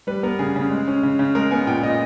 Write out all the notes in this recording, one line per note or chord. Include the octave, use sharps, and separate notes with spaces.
G3 B4
B3 A#4
C#3 G#4
C#3
G#3
C#4
C#3
C#3
G#3 A#4
B3 G#5
A#2 G5
A#2 D#5